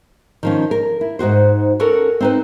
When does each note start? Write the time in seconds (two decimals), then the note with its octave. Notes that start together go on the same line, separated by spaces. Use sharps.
0.43 D#3 F3 C#4
0.71 A#4
1.01 E4
1.19 G#2 D#4 F#4 C5
1.80 C#4 F#4 A4 A#4
2.21 C4 D#4 B4